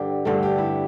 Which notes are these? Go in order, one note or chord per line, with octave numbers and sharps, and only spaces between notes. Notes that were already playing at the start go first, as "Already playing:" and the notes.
Already playing: G2 D3 G4
G2 D3 A3 A4
G4
E4